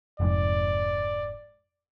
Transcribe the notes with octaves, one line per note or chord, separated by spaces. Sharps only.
F1 F2 G#2 D5